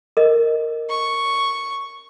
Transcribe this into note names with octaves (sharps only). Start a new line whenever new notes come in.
A#4 D#5
C#6